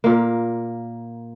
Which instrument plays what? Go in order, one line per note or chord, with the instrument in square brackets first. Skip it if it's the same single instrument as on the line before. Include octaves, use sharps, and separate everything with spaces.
[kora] A#2 A#3